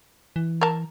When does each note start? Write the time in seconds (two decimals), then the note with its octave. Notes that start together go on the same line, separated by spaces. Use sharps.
0.36 E3
0.61 A#4 A5